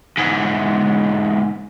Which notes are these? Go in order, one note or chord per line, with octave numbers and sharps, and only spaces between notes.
E2 G#2